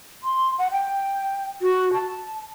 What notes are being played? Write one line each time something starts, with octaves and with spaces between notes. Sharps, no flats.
C6
F#5
G5
F#4
A5